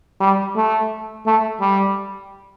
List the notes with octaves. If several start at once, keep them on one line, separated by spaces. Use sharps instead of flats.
G3
A3
A3
G3